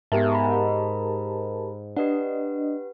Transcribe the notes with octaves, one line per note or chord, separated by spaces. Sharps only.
G#2 B3 G4 A#4 E5 A5
A#5 B5
D4 G4 B4 D#5 F#5